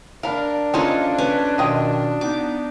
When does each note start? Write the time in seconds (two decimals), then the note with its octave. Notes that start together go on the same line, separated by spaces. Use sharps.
0.23 D4 A#4 F5 B5
0.74 C#4 D#4 F4 A4 C5
1.18 C#4 B4
1.58 B2 D#3 F4 D#5 G5
2.21 B3 D#4 D6